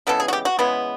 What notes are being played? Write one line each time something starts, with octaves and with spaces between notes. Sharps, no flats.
C#3 E3 G#3 B3 A4
G#4
F#4
G4
F#4
C#3 E3 G#3 B3